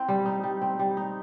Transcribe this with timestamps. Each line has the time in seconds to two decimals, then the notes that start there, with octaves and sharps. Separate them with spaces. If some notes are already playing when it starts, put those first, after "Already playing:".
Already playing: C4 E4
0.08 G3
0.26 D#4
0.43 G3
0.62 C4
0.79 G3
0.97 D#4